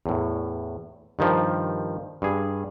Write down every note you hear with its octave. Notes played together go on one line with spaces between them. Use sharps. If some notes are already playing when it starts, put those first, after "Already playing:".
E2 A2
G2 D#3 F3
G2 G#4